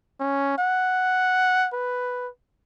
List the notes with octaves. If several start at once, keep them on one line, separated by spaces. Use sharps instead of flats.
C#4
F#5
B4